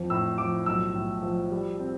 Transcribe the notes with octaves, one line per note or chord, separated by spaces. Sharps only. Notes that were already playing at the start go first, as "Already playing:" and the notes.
Already playing: F2 F3
A2 E6
F3 D6
B1 E6
A2
F3
G3
C4